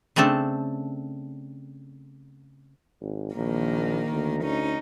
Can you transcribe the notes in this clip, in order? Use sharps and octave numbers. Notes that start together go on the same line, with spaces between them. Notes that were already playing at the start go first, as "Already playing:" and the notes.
C#3 A3 C4 D4 A4
G#1
A#1 D#3 A#3
D2
C#4 D#4